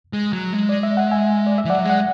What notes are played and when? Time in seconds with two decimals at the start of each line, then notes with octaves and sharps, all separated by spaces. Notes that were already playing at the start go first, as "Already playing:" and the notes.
0.13 G#3
0.33 F#3
0.53 G#3
0.69 D5
0.83 E5
0.97 F#5
1.11 E5 G#5
1.47 D5
1.58 E5
1.65 E3
1.70 F#3 D5 F#5
1.84 G#3
1.89 F#5